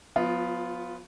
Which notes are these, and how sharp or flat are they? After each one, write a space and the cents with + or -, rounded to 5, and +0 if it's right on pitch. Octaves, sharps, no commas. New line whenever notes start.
F3 +45 B3 +0 F4 -5